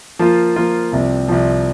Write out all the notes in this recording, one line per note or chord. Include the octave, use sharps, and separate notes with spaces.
F3 A#3 F4
F3 A#3 F4
C2 C3 F3
C2 C3 F3